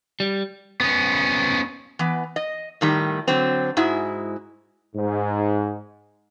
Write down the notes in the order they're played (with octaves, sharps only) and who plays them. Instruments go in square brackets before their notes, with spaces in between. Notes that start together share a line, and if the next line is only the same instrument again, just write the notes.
[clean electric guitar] G3
[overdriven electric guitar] B3 C#4
[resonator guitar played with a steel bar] E3 B3
D#5
A2 D#3 G3
D3 F#3 C4
G#2 G#3 E4 F#4
[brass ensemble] G#2